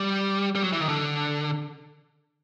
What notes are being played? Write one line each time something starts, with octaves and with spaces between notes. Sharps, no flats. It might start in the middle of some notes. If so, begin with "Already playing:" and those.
Already playing: G3
G3
F#3
E3
D#3
D3